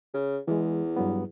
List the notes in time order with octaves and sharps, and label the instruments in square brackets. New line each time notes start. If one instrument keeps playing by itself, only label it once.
[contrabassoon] C#3
[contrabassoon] E2 [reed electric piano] E3 G#3
[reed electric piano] G2 F#3 B3